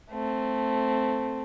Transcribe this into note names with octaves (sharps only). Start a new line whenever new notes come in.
A3 C4